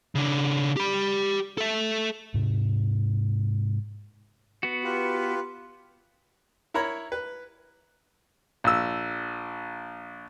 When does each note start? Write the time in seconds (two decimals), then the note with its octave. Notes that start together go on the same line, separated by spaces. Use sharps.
0.15 C#3 D4
0.77 G4 B5
1.58 A4 E5
2.34 G#2 C3
4.63 B3 F#4
4.84 F4 G4 B4
6.74 E4 A#4 C#5 A#5 B5
7.12 B4
8.64 A#1 E6